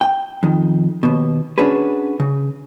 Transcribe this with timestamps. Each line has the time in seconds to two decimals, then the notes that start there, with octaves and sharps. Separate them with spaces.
0.01 G5
0.43 F2 D#3
1.03 D#2 B2
1.58 C#4 D4 F#4 G#4 B4
2.20 C#3